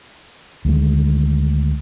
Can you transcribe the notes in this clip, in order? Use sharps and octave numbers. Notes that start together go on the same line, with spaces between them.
D2 D#3 G3 G#3